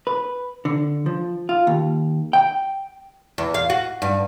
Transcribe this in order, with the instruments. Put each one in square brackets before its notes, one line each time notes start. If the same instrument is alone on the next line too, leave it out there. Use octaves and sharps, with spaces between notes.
[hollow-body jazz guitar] B4
D3
F3
F4
D#2
G5
[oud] E2
F5
F#4
G2